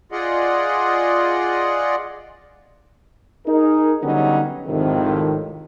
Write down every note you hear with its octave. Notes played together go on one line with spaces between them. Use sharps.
F4 G#4 D5 D#5 F#5
D#4 G#4 A#4
D3 F#3 G3 B3 C#4 D#4
G#1 F2 A2 C3 D#3